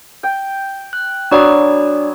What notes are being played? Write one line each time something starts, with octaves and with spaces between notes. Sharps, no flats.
G5
F#6
F#3 B3 D4 D5